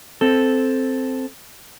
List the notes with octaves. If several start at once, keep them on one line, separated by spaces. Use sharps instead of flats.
C4 A4